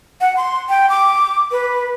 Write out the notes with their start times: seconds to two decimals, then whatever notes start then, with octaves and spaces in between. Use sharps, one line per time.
0.21 F#5
0.37 C6
0.69 G5
0.89 D6
1.51 B4